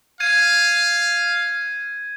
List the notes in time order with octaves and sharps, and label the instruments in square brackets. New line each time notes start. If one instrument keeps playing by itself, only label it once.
[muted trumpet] F5 [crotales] G#6 D#7